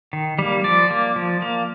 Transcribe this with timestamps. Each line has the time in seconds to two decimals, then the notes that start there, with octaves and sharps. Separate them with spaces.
0.13 D#3
0.39 G3 A#3
0.64 F3 D5
0.90 A#3
1.16 F3
1.42 A#3